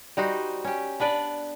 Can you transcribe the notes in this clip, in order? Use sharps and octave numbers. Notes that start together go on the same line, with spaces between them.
G3 D#4 F#4 C5
C#4 G4
B3 D4 B4 D5